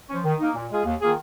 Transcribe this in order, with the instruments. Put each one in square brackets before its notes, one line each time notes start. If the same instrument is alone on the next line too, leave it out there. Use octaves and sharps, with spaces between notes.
[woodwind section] F3 C#4
D#3
A#3 D#4
A#2
G#3 F4 G#4
D#2
D#3 A#3 F4 G#4